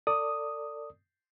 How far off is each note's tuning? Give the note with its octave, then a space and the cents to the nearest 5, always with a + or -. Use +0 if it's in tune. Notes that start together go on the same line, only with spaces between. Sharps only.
A4 +35 D5 +0 D#6 +0